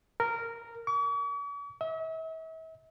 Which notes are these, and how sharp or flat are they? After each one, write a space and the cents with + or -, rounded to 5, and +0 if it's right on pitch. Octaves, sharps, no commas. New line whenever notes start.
A#4 -10
C#6 +45
E5 -40